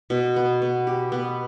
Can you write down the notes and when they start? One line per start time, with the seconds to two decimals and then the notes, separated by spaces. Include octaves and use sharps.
0.10 B2
0.36 B3
0.62 B3
0.87 G4
1.12 B3